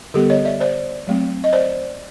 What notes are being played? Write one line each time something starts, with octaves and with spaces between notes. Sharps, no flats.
D3 G3 B3 G4 A4
C#5 D#5
D5 E5
C5 D5
F#3 A3 C4
D#5
C5 D5